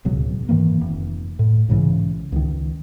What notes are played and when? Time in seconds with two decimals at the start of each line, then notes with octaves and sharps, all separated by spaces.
0.05 D1 C#2 B2 F#3
0.49 G#2 D#3 E3 A#3
0.81 F1
1.39 A2
1.68 B1 G#2 C#3 E3
2.32 C#2 D#3